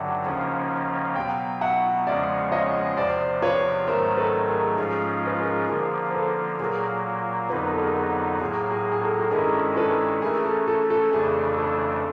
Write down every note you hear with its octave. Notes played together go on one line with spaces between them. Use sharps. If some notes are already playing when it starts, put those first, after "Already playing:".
Already playing: G2 D3 F#3 E5 F#5 G5
D#2 C#3 F3 A#3 C#4
B2 F#3 B3 F5 G5
E5 F#5
E2 C#3 F3 G#3 C#4 D5 E5
C#5 D#5
E2 C3 F3 C5 D5
B4 C#5
G#2 D#3 F#3 A3 A#4 C5
A4 B4
G#4 A#4
G#2 F3 G#3 C#4 F4 G#4
B4
G#4 A#4
D3 F3 A#3 G#4 A#4
C5
A4 B4
A#2 F#3 A#3 G#4 A#4
F2 D3 F#3 B3 D#4 B4
A#4
A4
G#4 A#4
A4
A2 F#3 A#3 G#4
G#4
G#4
A4
A4
G2 D#3 G#3 C#4 E4 G#4 A#4
A4 B4
E3 A3 C#4 G#4 A#4
A4
A4
A4
F2 C#3 E3 A3 D4 G#4
A4